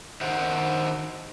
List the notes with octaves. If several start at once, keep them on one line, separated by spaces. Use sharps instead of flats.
D#3 C5 E5 F#5